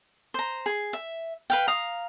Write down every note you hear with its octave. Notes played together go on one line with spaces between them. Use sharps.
C5 A#5
G#4
E5
B4 F5 G5
F5 A#5 D#6